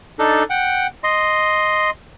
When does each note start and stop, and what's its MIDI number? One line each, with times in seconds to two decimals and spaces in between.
0.19 0.43 62
0.19 0.43 63
0.19 0.43 69
0.50 0.87 78
0.50 0.87 79
1.04 1.90 75
1.04 1.90 84